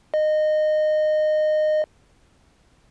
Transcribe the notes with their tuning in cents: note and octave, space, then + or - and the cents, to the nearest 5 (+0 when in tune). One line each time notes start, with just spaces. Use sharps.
D#5 -20